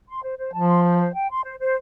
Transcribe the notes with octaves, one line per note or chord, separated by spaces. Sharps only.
C6
C5
C5
F3 A5
C6
C5
C5
G5
C6
C5
C5